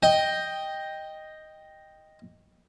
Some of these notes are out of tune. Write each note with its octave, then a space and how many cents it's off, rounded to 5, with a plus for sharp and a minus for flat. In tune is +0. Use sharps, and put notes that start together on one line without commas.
D#5 +0 G5 +5